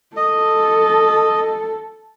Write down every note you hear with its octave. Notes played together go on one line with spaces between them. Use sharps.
A4 D#5